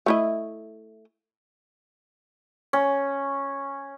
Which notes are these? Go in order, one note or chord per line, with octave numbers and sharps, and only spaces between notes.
A3 E4 D#5
C#4